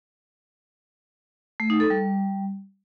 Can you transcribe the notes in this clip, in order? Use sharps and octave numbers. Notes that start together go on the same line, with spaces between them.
A3
D#4
A4
G3